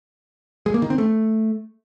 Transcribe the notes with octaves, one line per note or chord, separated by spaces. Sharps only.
G#3
A#3
D#3
C4
A3